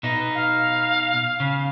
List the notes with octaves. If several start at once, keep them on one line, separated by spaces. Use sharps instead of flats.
B2 D#4
F5
C#3